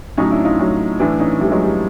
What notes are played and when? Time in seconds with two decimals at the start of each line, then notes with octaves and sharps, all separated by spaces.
0.17 A2 F#3 C#4 D#4
0.31 D4 E4
0.44 D#4 F4
0.59 A2 F#3
0.99 A2 E3 D4 E4
1.20 C#4 D#4
1.40 A2 E3 G3 A3
1.51 F#3 G#3
1.62 G3